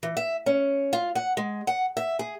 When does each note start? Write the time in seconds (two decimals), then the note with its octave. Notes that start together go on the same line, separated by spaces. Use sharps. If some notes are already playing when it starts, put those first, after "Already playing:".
0.03 E3
0.17 E5
0.46 C#4
0.93 F4
1.15 F#5
1.37 G#3
1.67 F#5
1.97 E5
2.19 G#4